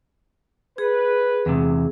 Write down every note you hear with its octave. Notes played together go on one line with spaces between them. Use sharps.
G#4 B4
E2 C3